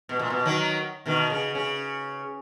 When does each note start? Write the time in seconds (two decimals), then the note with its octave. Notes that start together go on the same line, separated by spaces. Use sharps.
0.09 B2
0.19 A#2
0.30 B2
0.45 D#3 F#3
1.06 B2 D#3
1.30 C#3
1.55 C#3